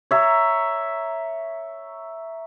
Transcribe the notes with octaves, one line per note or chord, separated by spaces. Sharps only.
C#5 E5 A#5